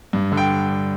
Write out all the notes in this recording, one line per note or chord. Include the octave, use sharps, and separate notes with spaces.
G2
D3
G5